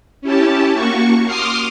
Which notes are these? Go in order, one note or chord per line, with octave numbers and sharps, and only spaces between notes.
C#4 E4 G4 A5
A#3 F#4 C#6
C6 D6 D#6 F6 C7